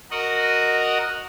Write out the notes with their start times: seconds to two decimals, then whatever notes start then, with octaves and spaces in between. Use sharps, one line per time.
0.11 F#4 A#4 D#5 F#5